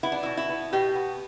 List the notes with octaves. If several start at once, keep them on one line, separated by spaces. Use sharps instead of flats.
B3 E4
D4
B2 E4
E4
B3
B2 G4
B3